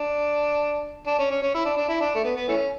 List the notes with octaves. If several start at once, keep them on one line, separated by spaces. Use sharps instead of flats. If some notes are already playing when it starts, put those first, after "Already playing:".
Already playing: D4
D4
C#4
C#4
C#4
E4
D4
D4
E4
D4
A3
B3
B3
E3 A3 C#4